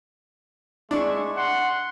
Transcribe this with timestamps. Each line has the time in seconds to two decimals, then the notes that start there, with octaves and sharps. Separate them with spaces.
0.91 G#3 D4 E5 C#6
1.37 F#5 C6